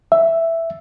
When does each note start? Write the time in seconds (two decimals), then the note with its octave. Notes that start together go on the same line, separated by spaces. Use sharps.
0.12 E5